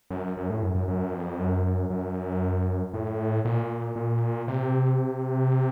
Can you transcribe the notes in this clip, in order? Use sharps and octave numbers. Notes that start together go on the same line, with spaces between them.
F#2
F#2
A2
F#2
F#2
F#2
F2
F#2
F#2
A2
A#2
A#2
C3